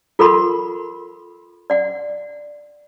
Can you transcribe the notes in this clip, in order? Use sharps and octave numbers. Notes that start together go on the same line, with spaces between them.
F4 A4 A#4 F#5 B5 C6
D5 F#5